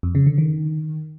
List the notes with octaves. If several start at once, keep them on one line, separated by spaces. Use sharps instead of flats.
F2
C#3
D3
D#3